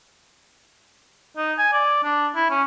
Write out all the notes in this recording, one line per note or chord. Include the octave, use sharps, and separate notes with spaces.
D#4
G#5
D5
D4
E4
C#4